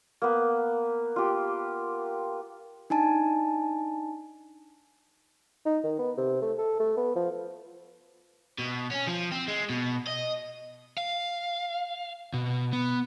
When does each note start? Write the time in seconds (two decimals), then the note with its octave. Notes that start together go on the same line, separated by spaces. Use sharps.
0.22 A#3 B3
1.16 F4 G4
2.90 D4 D#4 G#5 A5
5.66 D#4
5.84 D#3
5.99 B3
6.17 C3
6.42 A3
6.58 A4
6.80 A3
6.97 B3
7.16 F3
8.58 B2
8.91 C#4
9.07 F3
9.32 C4
9.48 G#3
9.70 B2
10.07 D#5
10.97 F5
12.34 B2
12.73 B3